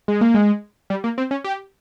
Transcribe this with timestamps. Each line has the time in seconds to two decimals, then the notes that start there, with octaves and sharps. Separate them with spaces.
0.08 G#3
0.21 A#3
0.34 G#3
0.90 G3
1.04 A#3
1.18 C4
1.31 C#4
1.44 G4